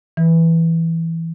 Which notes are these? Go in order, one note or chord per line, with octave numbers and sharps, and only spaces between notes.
E3